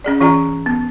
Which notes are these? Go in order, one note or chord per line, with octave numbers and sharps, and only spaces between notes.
C#4 G#4 D5
E3 C#4 F4 G#4 D5 A#5
B3